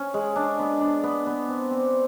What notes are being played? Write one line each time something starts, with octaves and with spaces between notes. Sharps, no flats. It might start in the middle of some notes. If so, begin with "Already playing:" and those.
Already playing: C#4
G#3
D4
B3
D4
B3
B3
C4
C4